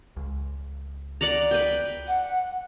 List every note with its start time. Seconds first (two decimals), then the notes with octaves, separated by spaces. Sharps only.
0.17 C#2
1.21 D5 F#5 A#5
1.51 B4 G5
2.08 F#5